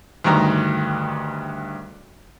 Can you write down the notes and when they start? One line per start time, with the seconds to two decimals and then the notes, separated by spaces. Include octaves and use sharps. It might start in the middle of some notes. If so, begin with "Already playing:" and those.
0.24 D2 G2 D#3 A#5